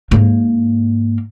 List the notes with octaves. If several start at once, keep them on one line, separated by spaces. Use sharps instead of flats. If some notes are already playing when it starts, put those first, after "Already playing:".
G#2 A#3